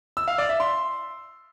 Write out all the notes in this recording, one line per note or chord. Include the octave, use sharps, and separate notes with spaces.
E6
F5
D5
E5
C6